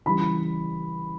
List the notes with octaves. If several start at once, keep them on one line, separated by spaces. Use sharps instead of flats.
C#3 E3 G3 B5